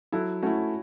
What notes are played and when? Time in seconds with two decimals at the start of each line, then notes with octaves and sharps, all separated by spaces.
0.12 F#3 E4 A4
0.43 A3 C#4 E4 F#4